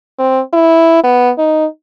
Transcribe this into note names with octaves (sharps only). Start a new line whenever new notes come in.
C4
E4
B3
D#4